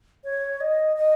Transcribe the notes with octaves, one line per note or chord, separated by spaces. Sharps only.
C#5
D#5
D#5